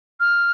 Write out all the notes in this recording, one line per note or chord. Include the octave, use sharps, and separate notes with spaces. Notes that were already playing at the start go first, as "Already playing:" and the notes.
F6